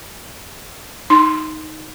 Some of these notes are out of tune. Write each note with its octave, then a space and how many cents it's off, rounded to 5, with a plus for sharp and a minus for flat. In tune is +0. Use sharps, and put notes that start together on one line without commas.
D#4 +0 C6 +0